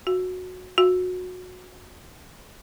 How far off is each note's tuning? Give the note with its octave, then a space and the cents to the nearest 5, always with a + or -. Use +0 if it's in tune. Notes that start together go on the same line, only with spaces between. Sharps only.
F#4 -15
F#4 -25